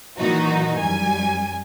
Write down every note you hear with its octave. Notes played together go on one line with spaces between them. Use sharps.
A#2 D#3 E3 F#3 D#4 F#4
F#2 G3 G#5